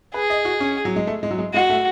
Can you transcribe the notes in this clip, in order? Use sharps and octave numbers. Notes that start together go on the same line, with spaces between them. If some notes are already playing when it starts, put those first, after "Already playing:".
G#4 B4
D#5
F#4
C#4
F#3
G#3
A3
G#3
F#3
G#3
G#3 F#4
A3